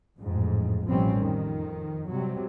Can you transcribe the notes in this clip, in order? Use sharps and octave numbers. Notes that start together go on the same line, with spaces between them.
A1 F2 G#2
A1 B2 F3 G3 C4 C#4
F2 D#3
C3 F#3 G3